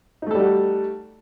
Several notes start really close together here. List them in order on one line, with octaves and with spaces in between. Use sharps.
D#4 A3 A4 G3 F#4